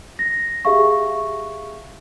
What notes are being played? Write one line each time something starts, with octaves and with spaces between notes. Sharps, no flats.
A#6
G4 G#4 E5 F5 C#6